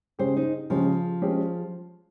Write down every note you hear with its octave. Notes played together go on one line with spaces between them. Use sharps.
C#3 G#3 C#4 G4 C5
D#4
C#3 F3 G#3 C#4 G4
G#3 C#4 G4 C5